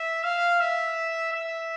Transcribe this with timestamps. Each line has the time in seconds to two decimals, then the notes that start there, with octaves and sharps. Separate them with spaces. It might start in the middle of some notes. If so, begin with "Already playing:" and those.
Already playing: E5
0.23 F5
0.60 E5
1.33 E5